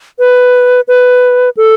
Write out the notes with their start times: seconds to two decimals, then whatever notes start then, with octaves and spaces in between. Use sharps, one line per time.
0.19 B4
0.88 B4
1.57 A4